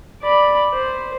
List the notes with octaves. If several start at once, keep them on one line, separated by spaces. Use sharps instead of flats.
D5 B5
C5